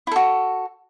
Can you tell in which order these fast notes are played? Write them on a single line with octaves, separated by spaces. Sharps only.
E4 A4 F#4